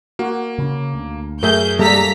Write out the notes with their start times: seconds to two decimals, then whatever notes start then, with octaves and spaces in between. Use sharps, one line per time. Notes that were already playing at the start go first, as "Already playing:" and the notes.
0.19 A#3 F#4
0.58 C#3 C#4
0.94 D2
1.43 F#2 F#3 A3 G#4 A#4 E5 G6
1.79 G3 A#3 A4 A#5 B6